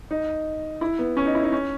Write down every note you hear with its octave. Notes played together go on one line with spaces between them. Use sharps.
D#4
E4
B3
C#4
D#4
E4
D#4
C#4